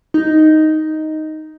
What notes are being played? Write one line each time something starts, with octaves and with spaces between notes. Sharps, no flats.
D#4